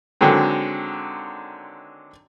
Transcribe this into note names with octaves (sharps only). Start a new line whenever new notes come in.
D3 D#3 F#3 G#3 C4